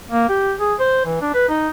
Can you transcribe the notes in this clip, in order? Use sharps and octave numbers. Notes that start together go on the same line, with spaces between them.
A#3
G4
G#4
C5
E3
D4
B4
D#4